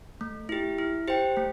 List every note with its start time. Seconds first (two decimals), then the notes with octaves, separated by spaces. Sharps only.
0.21 A3
0.49 E4 G4
0.78 E4
1.08 G4 C5 G5
1.37 A3